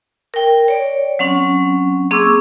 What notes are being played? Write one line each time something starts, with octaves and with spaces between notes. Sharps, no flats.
A#4 G5
C#5 D5
F#3 C4 C#4
A#3 C4 G#4 C#6 D6 E6